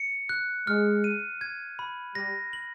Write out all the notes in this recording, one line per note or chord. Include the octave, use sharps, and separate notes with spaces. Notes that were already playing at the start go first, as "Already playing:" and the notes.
Already playing: C#7
F#6
G#3 F6
D#7
G#6
B5
G3 A#6
F#7